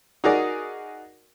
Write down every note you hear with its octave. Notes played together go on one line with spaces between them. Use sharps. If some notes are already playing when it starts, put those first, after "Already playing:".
D#4 F#4 G#4 A#4 D5